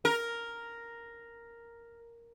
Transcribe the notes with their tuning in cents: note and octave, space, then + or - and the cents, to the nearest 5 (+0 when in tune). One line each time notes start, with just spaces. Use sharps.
A#4 +0